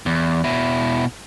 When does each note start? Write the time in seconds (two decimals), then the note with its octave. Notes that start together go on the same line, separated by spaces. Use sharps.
0.06 E2
0.44 B2 E4